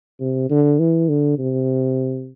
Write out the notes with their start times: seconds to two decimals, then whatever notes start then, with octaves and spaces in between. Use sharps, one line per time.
0.20 C3
0.50 D3
0.79 E3
1.09 D3
1.39 C3